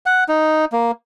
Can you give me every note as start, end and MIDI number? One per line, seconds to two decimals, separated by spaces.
0.06 0.24 78
0.28 0.65 63
0.72 0.91 58